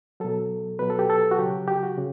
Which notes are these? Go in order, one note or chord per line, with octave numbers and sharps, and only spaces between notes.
B2 F#3 A4
B2 F#3 B4
A4
G4
A4
F#4
C#3 F#3 G4
G4
F#4
C#3